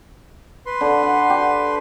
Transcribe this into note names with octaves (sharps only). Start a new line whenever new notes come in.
B4 C6
D3
F#5
G4